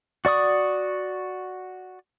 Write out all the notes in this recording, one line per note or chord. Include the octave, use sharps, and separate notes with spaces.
F#4 D5 C#6 D#6